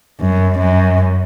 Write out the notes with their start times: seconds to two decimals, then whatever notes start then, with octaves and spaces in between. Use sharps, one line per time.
0.20 F#2
0.59 F#2